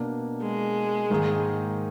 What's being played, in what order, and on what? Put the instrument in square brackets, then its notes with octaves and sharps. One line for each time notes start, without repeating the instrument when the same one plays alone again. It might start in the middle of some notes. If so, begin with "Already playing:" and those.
Already playing: [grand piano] B2 A#3 D4
[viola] G#3
[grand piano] G#2 D#3 A#3 D#4 G#4